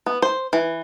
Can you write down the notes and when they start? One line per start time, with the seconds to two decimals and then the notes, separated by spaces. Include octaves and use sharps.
0.06 B3
0.22 C5
0.53 E3